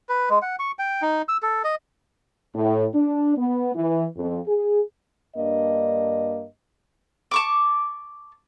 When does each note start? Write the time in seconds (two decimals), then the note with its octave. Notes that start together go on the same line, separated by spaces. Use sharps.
0.09 B4
0.30 G#3
0.42 F#5
0.59 C#6
0.79 G5
1.02 D#4
1.28 E6
1.42 A4
1.64 D#5
2.54 A2
2.94 D4
3.36 B3
3.75 E3
4.17 F2
4.47 G#4
5.36 G2 A#3 D4 D#5
7.31 A5 C#6 D6